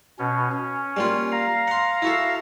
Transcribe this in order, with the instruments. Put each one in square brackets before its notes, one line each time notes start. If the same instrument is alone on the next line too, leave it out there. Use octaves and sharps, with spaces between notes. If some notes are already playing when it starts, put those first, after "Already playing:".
[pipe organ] B2 C#4
C#4
[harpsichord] G3 A#3 F4
[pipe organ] F5 A#5
[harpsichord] F#5 C6
E4 F#4 A4